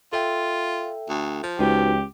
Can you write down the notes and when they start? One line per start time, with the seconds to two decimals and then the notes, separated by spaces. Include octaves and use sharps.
0.13 F4 A4 E5 G5
1.09 D2
1.43 F3
1.59 C#2 D#4 F#4 G4 B4